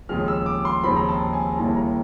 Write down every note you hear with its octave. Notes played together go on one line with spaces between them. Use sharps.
D#2 C#3 F3 G#3 C4 F6
E6
D6
C6
D#2 C#3 F3 G#3 C4 B5
A#5
A5
G#5
D#2 C#3 E3 G3 A#3 A5
A#5